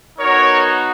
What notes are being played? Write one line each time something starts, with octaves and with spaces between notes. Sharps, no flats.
B3 D#4 F#4 A#4 C#5